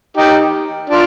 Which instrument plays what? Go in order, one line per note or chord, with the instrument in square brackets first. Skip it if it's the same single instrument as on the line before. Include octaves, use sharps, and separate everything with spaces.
[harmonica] D#4 G4
D4 F4